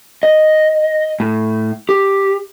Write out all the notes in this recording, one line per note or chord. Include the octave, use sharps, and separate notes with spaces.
D#5
A2
G4